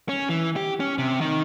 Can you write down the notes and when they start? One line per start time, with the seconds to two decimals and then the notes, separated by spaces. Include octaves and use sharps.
0.09 C#4
0.29 E3
0.56 G4
0.80 C#4
0.98 C3
1.21 D#3